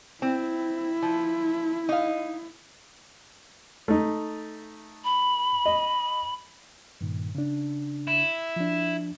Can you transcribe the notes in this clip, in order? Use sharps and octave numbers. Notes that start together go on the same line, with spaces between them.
C4 E4
F3
D#4 F5
A3 D#4
B5
D#5
G2 A#2 D#3
C#3 D4
E4
F3 D4